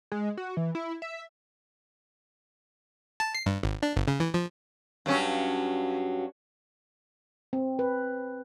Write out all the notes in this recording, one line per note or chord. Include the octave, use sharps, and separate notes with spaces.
G#3
F#4
E3
E4
E5
A5
C7
G2
G#1
D4
G1
C#3
E3
F3
G2 F#3 C#4
C4
B4